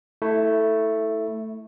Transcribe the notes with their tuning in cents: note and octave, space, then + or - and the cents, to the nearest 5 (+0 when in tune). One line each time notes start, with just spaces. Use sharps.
A3 +5 E4 -20